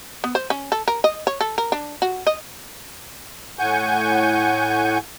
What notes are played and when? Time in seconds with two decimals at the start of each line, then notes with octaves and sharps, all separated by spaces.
0.24 B3
0.35 C5
0.50 C#4
0.72 A4
0.88 A#4
1.04 D#5
1.27 C#5
1.41 A4
1.58 A#4
1.72 D4
2.02 F#4
2.27 D#5
3.59 A2 F#5 G#5 C#6 G6